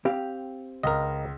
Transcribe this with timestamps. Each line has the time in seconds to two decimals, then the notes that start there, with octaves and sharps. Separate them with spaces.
0.05 C4 G4 F5
0.83 C#2 A#4 D#5